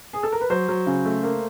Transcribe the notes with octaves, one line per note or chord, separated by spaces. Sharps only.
G#4
A4
A#4
B4
F#3 C5
F#3
C#3
A3
A#3